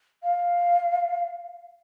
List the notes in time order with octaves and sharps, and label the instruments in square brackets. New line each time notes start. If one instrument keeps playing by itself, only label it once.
[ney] F5